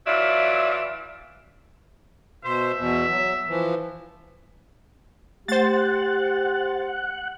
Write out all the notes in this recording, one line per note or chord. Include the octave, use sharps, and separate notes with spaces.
E3 F#3 F4 D5 E5
B2 C5 E5
E2 B2
F#3
E3 F3
A3 G4 C5 F#5 A6